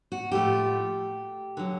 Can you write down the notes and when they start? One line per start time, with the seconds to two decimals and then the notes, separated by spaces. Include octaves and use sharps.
0.12 F#4
0.32 A2 F3 A3 G4
1.57 D3 F#3